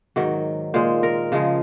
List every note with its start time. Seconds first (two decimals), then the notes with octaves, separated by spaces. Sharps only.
0.16 G#2 D#3 F#3
0.74 A#2 G#3 C5
1.03 A#4
1.32 C#3 F3 G#3